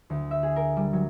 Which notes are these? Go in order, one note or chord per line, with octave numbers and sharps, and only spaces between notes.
D2
E5
G#4
A#4
G3
F#3